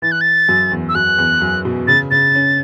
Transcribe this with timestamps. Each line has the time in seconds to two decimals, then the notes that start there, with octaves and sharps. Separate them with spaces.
0.02 E3 A6
0.12 F#6
0.21 A6
0.49 F#2
0.72 E2
0.89 E6
0.95 F#2 F#6
1.18 E2
1.42 F#2
1.65 B2
1.87 C#3 A6
2.11 C#3 A6
2.35 C#4